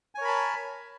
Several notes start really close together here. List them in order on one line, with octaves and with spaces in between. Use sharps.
G#5 C#5 A#4 B5 A5